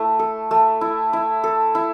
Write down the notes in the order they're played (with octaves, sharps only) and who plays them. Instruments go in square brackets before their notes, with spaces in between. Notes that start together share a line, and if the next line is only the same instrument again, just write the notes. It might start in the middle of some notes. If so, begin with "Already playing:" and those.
Already playing: [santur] A3 E4
A4
A3
E4
E4
A4
E4